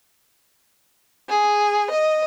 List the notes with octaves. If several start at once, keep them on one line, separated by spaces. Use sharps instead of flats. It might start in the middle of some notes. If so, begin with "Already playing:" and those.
G#4
D#5